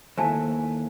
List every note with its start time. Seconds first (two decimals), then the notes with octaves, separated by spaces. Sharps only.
0.18 D#2 A3 E4 C5 G#5 A5